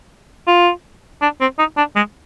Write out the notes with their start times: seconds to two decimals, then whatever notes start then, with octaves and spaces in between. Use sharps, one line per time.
0.47 F4
1.22 D4
1.41 C4
1.58 D#4
1.77 D4
1.96 G#3